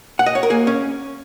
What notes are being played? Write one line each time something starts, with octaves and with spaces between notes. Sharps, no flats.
F#5
D#5
C#5
A#4
A#3 G#4
C#4